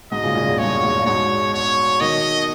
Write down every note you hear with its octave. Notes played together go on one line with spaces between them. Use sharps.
G#2 B2 D#5
A#2 C#3
A#2 C#3
E2
G2 C#5
E2 G#2
G#2 B2 C#5
C#5
B2 D#3 D#5